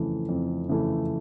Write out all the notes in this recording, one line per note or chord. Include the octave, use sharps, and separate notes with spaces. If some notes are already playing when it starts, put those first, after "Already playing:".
Already playing: F2 C#3 E3 A3
F2
C#3 E3 A3